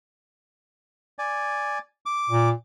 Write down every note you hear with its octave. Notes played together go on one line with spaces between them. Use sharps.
D5 G#5
D6
A#2